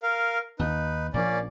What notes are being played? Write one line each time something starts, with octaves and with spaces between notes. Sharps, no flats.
A#4 F5
D#2 D#4 B4
A#1 F3 A#3 C#4 D5